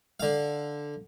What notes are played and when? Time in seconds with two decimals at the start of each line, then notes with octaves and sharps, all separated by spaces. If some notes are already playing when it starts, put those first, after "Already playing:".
0.20 D3 F5